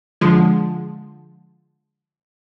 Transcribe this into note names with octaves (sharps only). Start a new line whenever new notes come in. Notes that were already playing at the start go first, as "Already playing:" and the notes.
D3 F3 G#3